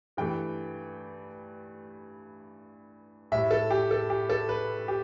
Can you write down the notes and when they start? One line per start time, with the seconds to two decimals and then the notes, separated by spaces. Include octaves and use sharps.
0.17 G2 E3 A3 G5
3.32 A2 G3 E5
3.51 A4
3.70 G4
3.91 A4
4.10 G4
4.30 A4
4.49 B4
4.88 G4